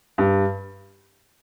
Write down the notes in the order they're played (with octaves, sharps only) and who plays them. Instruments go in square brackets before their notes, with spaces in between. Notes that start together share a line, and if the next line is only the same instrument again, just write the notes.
[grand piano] G2